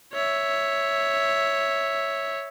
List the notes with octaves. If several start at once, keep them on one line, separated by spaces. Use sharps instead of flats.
C#5 E5